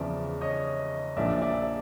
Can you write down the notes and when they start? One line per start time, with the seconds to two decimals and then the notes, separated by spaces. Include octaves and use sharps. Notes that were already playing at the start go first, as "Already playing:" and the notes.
Already playing: E2 C#3 F3 D5 E5
0.41 C#5 D#5
1.17 A#1 A#2 F3 D5 E5
1.42 D5 E5